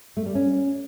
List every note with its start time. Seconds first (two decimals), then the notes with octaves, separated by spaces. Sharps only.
0.17 A3
0.26 G3
0.35 C#4